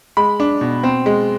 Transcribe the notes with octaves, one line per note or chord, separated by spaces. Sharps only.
G#3 B5
D4
B2
C4
G#3